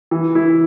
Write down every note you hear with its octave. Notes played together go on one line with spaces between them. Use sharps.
E3
E4